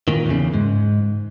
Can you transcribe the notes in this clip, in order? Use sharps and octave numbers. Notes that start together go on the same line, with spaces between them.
A#2 D#3
E2 C#3
G#2